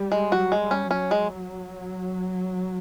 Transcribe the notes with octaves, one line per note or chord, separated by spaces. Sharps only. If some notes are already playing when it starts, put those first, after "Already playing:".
Already playing: G3
G#3
F#3 F#4
G#3
G3
C#4
F#3 C#4
G#3